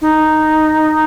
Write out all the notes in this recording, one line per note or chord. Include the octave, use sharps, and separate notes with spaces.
D#4